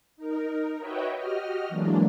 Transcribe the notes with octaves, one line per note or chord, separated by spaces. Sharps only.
D#4 A#4
F#4 B4 C#5 D#5 E5 G5
F#4 G4 D#5 F6
E3 F#3 G#3 A#3 D4